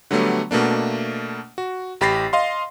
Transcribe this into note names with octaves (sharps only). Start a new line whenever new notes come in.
D3 F#3 G3 A3 B3
B2 A3 A#3 D4
F#4
A1 G4 B5 A6 A#6 C7
D#5 F5 C6